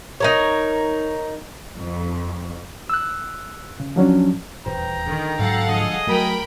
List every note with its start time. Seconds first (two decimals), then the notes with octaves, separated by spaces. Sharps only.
0.20 D#4 A#4 C#5
1.77 F2
2.90 E6 F#6
3.80 C#3
3.96 F3 F#3 C#4 D4
4.66 D#1 E2 B4 C5 G5 A#5
5.07 D3 D#3
5.39 G#2 F#3 A4 F5 F#5
5.68 D3 F3 G#3 G#4 D#5
6.07 F#3 A3 A#4 G5 B5